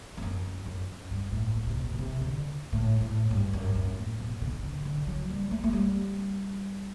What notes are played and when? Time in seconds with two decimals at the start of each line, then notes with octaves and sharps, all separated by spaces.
0.17 E2
0.22 F#2
0.66 F#2
1.11 G2
1.32 A2
1.55 A2
1.66 C3
1.76 B2
1.94 B2
1.99 C3
2.21 D3
2.72 A2
3.01 A2
3.31 G2
3.53 F#2
3.75 F#2
3.97 A2
4.19 B2
4.42 D3
4.52 E3
4.63 D3
4.85 D3
5.07 F#3
5.29 G3
5.51 A3
5.64 A3
5.73 G3